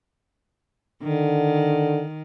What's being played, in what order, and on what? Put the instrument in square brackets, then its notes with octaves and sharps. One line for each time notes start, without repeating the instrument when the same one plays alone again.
[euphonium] D3 [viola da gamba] D#3